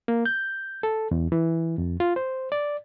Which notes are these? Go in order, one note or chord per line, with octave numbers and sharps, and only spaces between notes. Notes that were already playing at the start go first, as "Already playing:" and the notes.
A#3
G6
A4
E2
E3
F2
F4
C5
D5